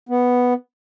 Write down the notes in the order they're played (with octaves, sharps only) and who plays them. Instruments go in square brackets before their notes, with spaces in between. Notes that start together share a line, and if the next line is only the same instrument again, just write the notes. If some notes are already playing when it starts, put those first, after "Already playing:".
[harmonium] B3